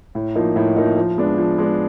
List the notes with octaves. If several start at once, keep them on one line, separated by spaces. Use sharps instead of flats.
A2
F3 A#3 D#4
A2
F3 A#3 D#4
F3
G#3 B3 D4
F3
G#3 B3 D4